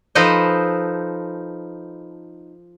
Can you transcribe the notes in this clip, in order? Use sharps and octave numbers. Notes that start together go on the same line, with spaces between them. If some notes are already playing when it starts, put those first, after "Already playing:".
F3 D#4 A4 B4 C5 D#5